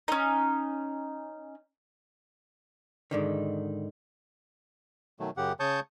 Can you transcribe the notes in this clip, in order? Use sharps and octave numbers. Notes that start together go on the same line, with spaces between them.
C#4 D#4
G#2 D3 D#3
B2 D#3 F#3 A3
F#2 C#3 G4 F#5
C#3 C#5 A5 C#6 D#6 G6